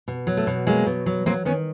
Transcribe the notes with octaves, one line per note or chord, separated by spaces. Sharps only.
B2
F#3
A3
B2
F#3 G#3 A#3
B2
F#3
F#3 A#3 C4
D#3 B3 C#4